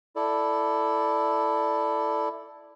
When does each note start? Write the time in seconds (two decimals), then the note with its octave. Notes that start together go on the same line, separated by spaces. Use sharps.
0.16 E4 A4 D5